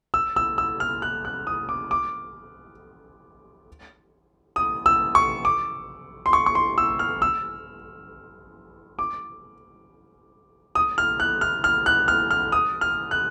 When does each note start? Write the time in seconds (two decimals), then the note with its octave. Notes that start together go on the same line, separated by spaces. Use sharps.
0.14 E6
0.36 E6
0.58 E6
0.80 F6
1.02 F#6
1.25 F#6
1.47 D#6
1.69 D6
1.91 D6
4.56 D#6
4.86 E6
5.15 C#6
5.45 D6
6.26 C6
6.33 C#6
6.46 C#6
6.55 C6
6.78 E6
6.99 F6
7.22 E6
8.99 D6
10.75 D#6
10.98 F6
11.20 F#6
11.41 F6
11.64 F6
11.86 F#6
12.08 F6
12.31 F6
12.52 D#6
12.81 F6
13.11 F#6